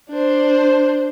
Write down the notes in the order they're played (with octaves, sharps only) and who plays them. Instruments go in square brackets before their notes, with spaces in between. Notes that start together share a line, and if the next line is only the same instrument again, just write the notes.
[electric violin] D4 C5